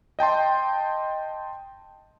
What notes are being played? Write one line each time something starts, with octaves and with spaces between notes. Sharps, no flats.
D#5 G5 A5 C6